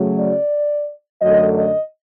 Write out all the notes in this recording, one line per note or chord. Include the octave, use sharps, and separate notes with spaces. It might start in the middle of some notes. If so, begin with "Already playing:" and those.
Already playing: C#3 F#3 A3
D5
F#2 D3 F#3 A3 D#5
D#5